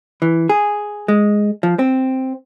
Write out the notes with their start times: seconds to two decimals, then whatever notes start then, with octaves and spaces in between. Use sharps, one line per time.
0.22 E3
0.49 G#4
1.08 G#3
1.63 F3
1.79 C4